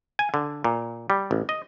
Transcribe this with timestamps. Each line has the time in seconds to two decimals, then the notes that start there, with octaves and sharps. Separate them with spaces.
0.19 G#5
0.34 D3
0.64 A#2
1.10 G3
1.31 A1
1.49 D#5